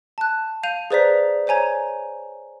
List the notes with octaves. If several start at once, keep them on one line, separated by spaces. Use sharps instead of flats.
A5 F#6
F5 G6 D#7 F7
G#4 B4 C5 D5 A#5 B6
C5 C#5 G#5 A#5 G#6